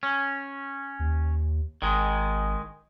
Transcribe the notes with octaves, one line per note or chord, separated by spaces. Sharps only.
C#4
D#2
G#1 D#3 G#3